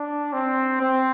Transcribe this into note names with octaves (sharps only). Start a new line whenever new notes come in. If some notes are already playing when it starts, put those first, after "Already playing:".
Already playing: D4
C4
C4